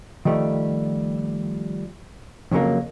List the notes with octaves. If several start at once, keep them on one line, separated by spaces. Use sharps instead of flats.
D#3 F3 G3 A3
F2 C#3 F#3 G#3 A#3